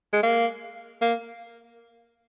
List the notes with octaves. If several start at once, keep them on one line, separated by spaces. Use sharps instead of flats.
G#3
A#3
A#3